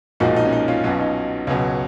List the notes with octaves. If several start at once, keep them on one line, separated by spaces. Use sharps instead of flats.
B1 A#2 F3 G#3 D#4 F#4
D#4
C#4
D#4
C#4 F4
B1 B2 F#3 C#4 F4
D#4
C#2 B2 F#3 C#4